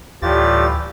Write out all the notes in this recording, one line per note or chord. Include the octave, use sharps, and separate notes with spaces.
D2 A2 E3 G3 F4 G4 A6